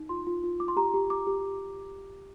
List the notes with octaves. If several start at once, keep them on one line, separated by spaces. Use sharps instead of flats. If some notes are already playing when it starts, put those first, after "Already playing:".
Already playing: D#4
F4 C6
F4
F4
F4 D6
C6
G4 A#5
G4
G4 D6
G4